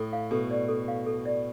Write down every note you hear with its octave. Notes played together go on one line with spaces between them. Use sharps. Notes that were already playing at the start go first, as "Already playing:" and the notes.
Already playing: A2 A4
F5
B2 A4
D5
A4
F5
A4
D5